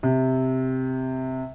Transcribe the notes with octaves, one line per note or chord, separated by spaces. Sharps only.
C3